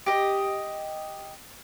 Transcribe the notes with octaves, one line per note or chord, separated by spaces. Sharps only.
G4 D#5